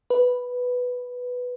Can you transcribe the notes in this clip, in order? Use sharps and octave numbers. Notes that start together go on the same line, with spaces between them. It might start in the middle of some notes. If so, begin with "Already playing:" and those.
B4